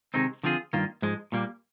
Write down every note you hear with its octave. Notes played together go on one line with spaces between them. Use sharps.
C3 D#3 G#3 C4 D#4
D3 F3 C4 F4 G#4
G2 D#3 A#3 F4
G#2 F3 G#3
A#2 G3 A#3